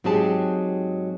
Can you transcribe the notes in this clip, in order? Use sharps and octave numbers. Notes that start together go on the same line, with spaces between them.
G#2 F#3 C4 G4 G#4 A5